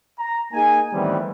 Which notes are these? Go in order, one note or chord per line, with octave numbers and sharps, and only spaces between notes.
A#5
A#3 D#4 G#4 G#5
A2 D#3 E3 G3 B3 C4